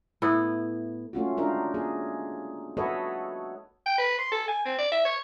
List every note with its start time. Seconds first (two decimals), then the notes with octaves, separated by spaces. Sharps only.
0.22 A2 B3 E4
1.13 A3 C#4 F4 F#4
1.37 G#3 D4 D#4 F4 A#4
1.74 A#3 G#4
2.77 F#4 A4 B4 C#5 D#5 E5
3.86 G5
3.98 B4
4.19 C6
4.32 A4
4.48 G#5
4.66 C4
4.79 D5
4.92 E5
5.05 C#5